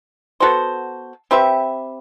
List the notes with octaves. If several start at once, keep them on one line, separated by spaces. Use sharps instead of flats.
B3 F#4 A4 C5
C4 G4 B4 E5